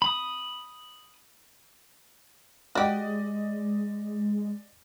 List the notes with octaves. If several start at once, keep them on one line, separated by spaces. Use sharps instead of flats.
B5 D#6
G#3 F#4 G4 D5 D#5